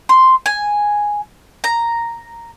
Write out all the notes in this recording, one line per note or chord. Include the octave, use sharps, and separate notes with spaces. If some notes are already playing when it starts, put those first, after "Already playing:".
C6
G#5
A#5